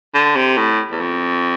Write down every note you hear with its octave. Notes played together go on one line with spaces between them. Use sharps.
D3
C3
A2
E2
F2